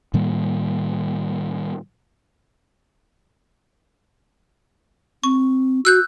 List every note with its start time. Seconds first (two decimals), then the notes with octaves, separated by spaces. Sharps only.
0.14 A2 D#3 G3 A#3
5.24 C4 C#6
5.85 F#4 E6 F#6 G6